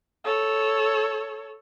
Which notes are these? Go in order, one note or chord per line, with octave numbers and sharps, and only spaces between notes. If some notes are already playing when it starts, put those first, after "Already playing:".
A4 C#5